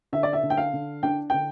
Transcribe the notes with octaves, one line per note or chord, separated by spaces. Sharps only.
D3 E5
D5
E5
D3
G5
F5
D3
D4 G5
D3 G5